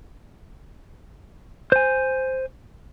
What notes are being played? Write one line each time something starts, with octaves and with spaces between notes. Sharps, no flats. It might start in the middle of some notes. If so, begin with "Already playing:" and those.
C5 G#5